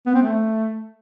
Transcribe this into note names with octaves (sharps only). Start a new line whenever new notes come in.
B3
C4
A3